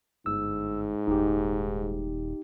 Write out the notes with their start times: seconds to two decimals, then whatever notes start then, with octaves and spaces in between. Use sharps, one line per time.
0.26 G1 G#2 E6
1.07 D#1 D#4 G4